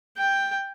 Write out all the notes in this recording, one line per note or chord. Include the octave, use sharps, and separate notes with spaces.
G5